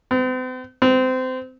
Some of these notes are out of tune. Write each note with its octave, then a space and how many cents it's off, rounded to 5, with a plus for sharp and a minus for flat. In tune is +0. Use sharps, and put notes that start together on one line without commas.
C4 -45
C4 -25